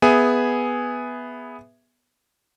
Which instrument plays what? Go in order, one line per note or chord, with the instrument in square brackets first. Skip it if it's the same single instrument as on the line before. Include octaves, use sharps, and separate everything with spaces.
[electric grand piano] B3 G#4 E5 G#5